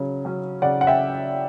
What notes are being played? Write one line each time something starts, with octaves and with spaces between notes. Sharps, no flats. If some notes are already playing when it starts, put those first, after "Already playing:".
Already playing: C#3 F#3
F#3 C#4
C#3 D5 F#5
F#5
E5 G5